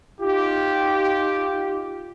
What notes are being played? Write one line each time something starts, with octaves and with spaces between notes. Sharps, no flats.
D#4 F4 G4